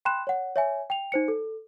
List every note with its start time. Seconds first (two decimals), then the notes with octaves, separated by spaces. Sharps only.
0.05 G5 B5 C6 F#6 E7
0.27 C#5 F#5
0.56 C#5 E5 G#5
0.90 G5 F7
1.12 D#4 C5 C#7
1.28 A4